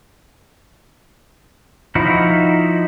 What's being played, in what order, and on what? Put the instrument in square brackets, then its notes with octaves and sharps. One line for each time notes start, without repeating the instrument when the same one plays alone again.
[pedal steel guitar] F3 D#4 E4 F#4